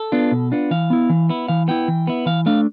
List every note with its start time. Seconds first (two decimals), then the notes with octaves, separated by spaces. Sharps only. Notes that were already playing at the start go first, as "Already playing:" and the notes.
Already playing: A4
0.12 B3 D4 F4
0.32 B2
0.52 B3 D4 F4
0.71 E3 F5
0.90 B3 E4
1.10 E3
1.29 B3 E4
1.48 E3 F5
1.68 B3 E4 G5
1.88 E3
2.07 B3 E4
2.26 E3 F5
2.46 A3 D4 F5